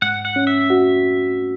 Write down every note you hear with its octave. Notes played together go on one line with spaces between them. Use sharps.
G#2 F#5
F#5
C#4
E5
F#4